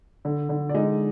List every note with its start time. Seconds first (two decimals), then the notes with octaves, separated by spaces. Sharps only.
0.25 D3
0.49 D3
0.69 D5
0.74 G#3 D#4 D#5